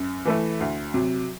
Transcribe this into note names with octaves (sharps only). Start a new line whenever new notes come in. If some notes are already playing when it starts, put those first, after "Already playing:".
Already playing: F#2
E3 A3 E4
D2
C3 F#3